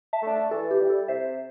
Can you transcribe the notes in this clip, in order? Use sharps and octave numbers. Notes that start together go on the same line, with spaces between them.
E5 A5
A3 D4
E3 A4
G4
G3 E4
A4
C3 C5 E5